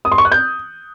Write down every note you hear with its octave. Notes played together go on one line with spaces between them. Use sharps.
D#6
C6
C#6
F#6
G6